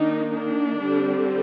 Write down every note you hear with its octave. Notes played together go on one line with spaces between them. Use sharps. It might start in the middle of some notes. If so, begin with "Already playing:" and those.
Already playing: D#3 A#3 D4 D#4
D4
D3 G3 C4